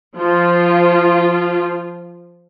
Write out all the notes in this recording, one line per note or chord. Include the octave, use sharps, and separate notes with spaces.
F3 F4